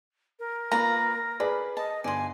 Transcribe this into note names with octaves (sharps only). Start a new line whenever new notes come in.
A#4
A#3 F4 B4 D5 A#5
G#4 B4 D5 B5
D#5 A5
G1 D5 G#5 C6 A#6